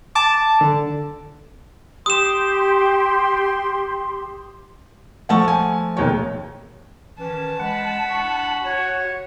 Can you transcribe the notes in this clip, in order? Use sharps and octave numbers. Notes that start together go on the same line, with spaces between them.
A5 D6
D3
G4 C6 D#6 E7
F3 A3 F#5 A5 C#6
G#5
E1 D#2 C#5
D#3 E3 C#4 A5
G#3 F#5 B5
D4 E4 C#6
F#4 C#5